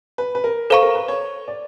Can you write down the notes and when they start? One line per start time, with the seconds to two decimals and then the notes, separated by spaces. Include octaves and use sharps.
0.18 B4
0.35 B4
0.44 A#4
0.70 A4 B4 C5 F5 A#5 C#6
0.82 A#4
0.95 B4
1.08 C#5
1.48 D5